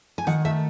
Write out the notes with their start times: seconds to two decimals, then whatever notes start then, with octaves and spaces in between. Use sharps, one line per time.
0.18 G#5
0.27 D#3 F#5
0.45 A3 E5